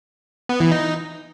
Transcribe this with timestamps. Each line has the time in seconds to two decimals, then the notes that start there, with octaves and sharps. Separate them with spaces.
0.49 B3
0.60 E3
0.71 D#4